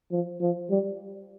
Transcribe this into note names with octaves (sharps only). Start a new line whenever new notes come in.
F3
F3
G3